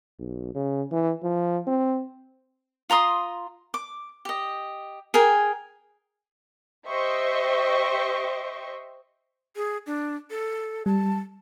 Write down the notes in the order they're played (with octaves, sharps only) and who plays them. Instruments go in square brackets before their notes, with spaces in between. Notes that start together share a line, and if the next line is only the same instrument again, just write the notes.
[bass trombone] B1
C#3
E3
F3
C4
[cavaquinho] F4 A#5 C6 D#6
D6
G4 D#5
G#4 A#4 G5 G#5
[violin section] G4 C5 D#5 E5 C#6
[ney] G#4
D4
A4
[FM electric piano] G3 [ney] A5